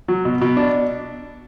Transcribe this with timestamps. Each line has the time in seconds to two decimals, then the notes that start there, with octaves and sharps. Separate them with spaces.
0.08 F#3
0.25 B2
0.41 B2
0.57 D4